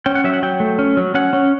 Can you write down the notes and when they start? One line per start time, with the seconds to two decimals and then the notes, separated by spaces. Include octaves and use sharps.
0.06 C#4 G5
0.15 F#5
0.24 F#3 E5
0.33 F#5
0.43 F#3 G5
0.60 A3
0.79 C#4
0.97 F#3
1.14 C#4 F#5
1.33 C#4